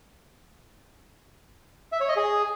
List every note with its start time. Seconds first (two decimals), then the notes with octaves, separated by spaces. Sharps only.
1.92 E5
2.00 C#5
2.08 D#5
2.17 G#4